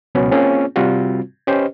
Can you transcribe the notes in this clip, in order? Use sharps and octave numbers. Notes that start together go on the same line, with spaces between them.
C#2 B2 F#3 B3 C#4
A#3 C4 C#4 F4 G#4
C3 G3 C4 F4 F#4
C#4 G4 B4 C5 D#5